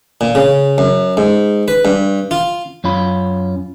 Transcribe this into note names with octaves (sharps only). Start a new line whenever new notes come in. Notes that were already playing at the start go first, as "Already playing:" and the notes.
A#2
C#3
F#2
G#2
B4
G2
F4
F#2 C#4 F4 B5